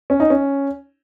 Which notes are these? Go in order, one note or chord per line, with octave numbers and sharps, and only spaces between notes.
C#4
D#4
C#4